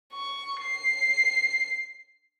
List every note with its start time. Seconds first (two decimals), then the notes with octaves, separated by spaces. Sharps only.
0.13 C#6
0.61 C7